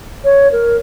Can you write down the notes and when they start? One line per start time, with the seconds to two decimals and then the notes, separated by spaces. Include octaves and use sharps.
0.24 C#5
0.52 A#4